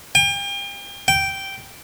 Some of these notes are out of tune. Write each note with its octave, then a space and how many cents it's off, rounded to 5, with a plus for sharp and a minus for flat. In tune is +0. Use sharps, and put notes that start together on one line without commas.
G5 +40
G5 -5